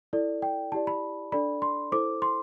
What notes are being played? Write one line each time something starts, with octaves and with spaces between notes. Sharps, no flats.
E4 A4 D5
G5
E4 G4 D5 A5
B5
D4 A4 D5 B5
C6
E4 A4 C5 D6
C6